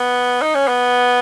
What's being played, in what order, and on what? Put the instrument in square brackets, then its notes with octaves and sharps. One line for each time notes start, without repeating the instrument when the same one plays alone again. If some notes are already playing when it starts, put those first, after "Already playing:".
Already playing: [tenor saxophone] B3
D#4
C#4
B3